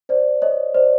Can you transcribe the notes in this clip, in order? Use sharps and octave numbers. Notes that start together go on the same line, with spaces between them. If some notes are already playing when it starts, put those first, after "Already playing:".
C5 D5
C#5 D#5
C5 D5